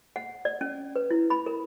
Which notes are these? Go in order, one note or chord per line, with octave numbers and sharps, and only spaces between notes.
F#5
D5
C#4
B4
E4
B5
A#4